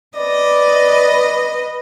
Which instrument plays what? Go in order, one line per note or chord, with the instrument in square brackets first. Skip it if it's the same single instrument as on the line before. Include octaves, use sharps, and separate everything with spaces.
[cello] B4 [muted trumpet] D5 [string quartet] D#5